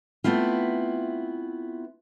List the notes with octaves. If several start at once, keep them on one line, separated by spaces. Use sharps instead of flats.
A3 B3 C4 E4 F4